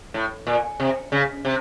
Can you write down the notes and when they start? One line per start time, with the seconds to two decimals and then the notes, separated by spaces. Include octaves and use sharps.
0.14 A2
0.47 A#2
0.80 C3
1.12 C#3
1.45 C3